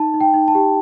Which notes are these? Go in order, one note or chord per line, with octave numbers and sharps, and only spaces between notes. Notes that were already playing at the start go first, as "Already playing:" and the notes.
Already playing: D#4 A5
D#4
G5
D#4
A5
G4